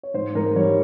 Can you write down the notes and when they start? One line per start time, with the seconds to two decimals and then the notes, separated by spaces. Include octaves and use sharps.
0.03 C#5
0.14 G#2 C5
0.35 G#2 A#4
0.56 G3 C#5